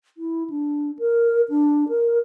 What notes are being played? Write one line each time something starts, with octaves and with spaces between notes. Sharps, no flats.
E4
D4
A#4
D4
A#4